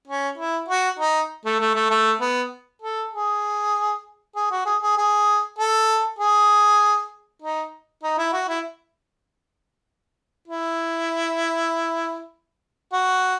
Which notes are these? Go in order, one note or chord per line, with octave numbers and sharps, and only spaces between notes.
C#4
E4
F#4
D#4
A3
A3
A3
A3
B3
A4
G#4
G#4
F#4
G#4
G#4
G#4
A4
G#4
D#4
D#4
E4
F#4
E4
E4
F#4